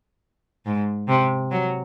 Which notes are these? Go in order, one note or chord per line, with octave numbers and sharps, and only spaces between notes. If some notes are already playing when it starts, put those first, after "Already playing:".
G#2
C3
F#3